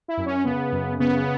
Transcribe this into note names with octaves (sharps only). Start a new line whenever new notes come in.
E4
F#2
C#4
C#3 B3
F#2
C#3 B3